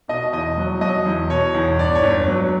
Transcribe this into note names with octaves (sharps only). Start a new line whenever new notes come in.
B2 D#5
E2 D#5
F#3
F#3 D#5
E2
B2 C#5
E2
G1 D5
C#5
G1
F#3